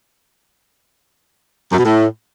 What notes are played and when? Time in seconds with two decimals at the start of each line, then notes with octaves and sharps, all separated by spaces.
1.71 F#2
1.78 B2
1.84 A2